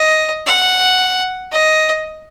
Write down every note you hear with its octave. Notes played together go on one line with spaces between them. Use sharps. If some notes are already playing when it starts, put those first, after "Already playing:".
Already playing: D#5
F#5
D#5